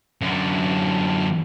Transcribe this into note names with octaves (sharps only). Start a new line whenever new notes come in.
F#2 D3